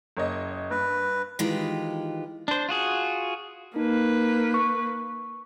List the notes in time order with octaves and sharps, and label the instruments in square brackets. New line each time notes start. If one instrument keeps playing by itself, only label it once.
[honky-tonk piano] F#1 C#5 D#5
[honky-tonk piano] G2 [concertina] B4
[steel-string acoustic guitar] D#3 E3 G#3 F4 G4
[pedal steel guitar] D4 C5
F4 F#4 G#4
[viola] A#3 B4 [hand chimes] D#4
[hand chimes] C#6